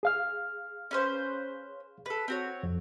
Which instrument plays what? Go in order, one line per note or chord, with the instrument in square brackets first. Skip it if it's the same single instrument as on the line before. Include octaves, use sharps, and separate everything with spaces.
[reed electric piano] G#4 F5 F6
[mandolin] C#4 B4 C5
A4 B4
C4 F#4 C#5
[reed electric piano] F2